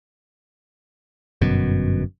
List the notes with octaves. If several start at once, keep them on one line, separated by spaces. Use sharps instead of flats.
G1 F#2 B2